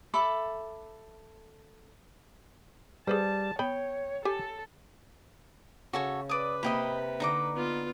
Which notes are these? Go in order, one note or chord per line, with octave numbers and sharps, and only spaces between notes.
A4 E5 B5 D6
G3 G#4 B4 C5 A5
B3 C#5 G5 B5
G4 A4 G#5
C#3 F#4 A4 C#5
B4 D5 D#6
C3 A#3 D#5 G5 B5
D3 D#4 A#5 D6
B3 F4